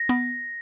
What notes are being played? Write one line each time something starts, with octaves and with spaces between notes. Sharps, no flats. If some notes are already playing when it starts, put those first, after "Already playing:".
Already playing: A#6
B3